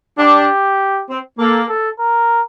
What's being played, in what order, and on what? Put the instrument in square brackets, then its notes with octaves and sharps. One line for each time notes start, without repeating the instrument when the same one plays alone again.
[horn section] D4 [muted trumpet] G4
[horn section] C4
[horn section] A#3 [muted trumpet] A4
[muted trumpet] A4
A#4